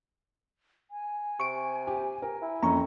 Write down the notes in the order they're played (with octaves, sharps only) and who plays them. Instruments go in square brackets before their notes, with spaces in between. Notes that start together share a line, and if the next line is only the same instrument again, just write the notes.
[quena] G#5
[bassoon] C3 [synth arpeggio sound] C#6 D7
[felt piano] G4
A#4
[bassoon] E4
[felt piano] F2 C#4 [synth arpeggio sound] A#5 C#6